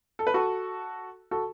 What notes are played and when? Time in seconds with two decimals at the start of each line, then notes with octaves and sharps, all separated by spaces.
0.19 A4
0.27 B4
0.34 F#4 A4
1.31 F#4 A4